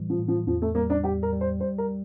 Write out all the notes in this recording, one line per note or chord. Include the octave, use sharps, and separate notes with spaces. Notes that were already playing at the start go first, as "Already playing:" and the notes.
Already playing: A2 E3 G3
F3
A2
F3
E2 F3
A3
G3 A#3
D4
G3 G4
A#4
G3
C5
G3 C5
A#4
G3